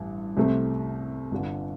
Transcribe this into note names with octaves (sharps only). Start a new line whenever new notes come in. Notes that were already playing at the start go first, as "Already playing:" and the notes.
Already playing: A1 G2
C2 C3 A3 C4
G1 G2 D3